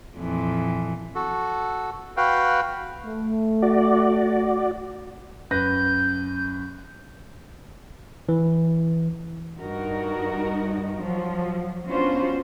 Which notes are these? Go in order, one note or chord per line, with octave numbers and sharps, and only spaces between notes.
F2 A#2 E3
F#4 A4
F#4 B4 F5 G5
A3
F#4 D5
F#2 B4 G6 A#6
E3
G2 D#4 F#4 A#4
F3 F#3
B3 C#4 D4 F4 F#4 C5